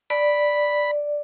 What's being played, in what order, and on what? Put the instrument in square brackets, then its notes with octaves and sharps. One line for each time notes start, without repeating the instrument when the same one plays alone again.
[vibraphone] D5 [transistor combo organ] B5